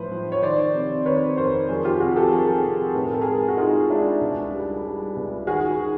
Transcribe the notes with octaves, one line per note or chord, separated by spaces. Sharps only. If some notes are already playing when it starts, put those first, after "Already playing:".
Already playing: A2 F3 B4 C5
F3
C#5
D#3 C5 D5
C3
D#3 B4 C#5
F2 A#4 C5
F3 G#4 A#4
F4 G4
C3 F#4 G#4
G4 A4
F3 G#4 A#4
C3
A2 B4
A#4
A4
G#3 G#4 A#4
F#4
G#3 D#4 F4
G#3 D4 E4
C#2
G3
G3
C#2
D#3 F#4 G#4
D#3